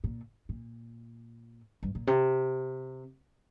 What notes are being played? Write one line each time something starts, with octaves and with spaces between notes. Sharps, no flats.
A#2
A#2
G2
A#2
C3